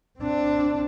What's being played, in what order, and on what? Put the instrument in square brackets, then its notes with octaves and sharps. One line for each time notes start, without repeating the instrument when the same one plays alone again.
[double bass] C4 D4